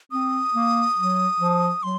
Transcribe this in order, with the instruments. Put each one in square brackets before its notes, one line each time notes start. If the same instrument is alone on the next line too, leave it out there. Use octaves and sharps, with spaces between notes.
[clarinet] C4 [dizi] D#6
[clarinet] A#3
F#3
F3
[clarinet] F#3 [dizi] C6